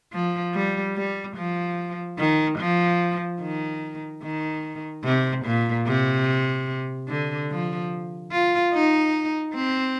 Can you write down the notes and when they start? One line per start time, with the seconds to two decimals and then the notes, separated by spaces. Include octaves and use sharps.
0.13 F3
0.54 G3
0.96 G3
1.37 F3
2.19 D#3
2.59 F3
3.42 D#3
4.23 D#3
5.05 C3
5.45 A#2
5.87 C3
7.08 D3
7.51 F3
8.32 F4
8.73 D#4
9.55 C4